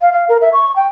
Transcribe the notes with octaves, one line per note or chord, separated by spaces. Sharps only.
F5
F5
A#4
E5
C#6
G5